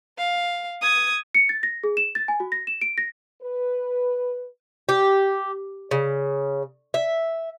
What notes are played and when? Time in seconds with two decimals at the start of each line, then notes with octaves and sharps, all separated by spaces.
0.18 F5
0.82 D#6 G#6
1.35 C#7
1.49 A6
1.63 A#6
1.84 G#4
1.97 E7
2.15 A6
2.28 G#5
2.40 F#4
2.52 A#6
2.67 E7
2.81 D7
2.98 A#6
3.42 B4
4.89 G4
5.91 C#3
6.94 E5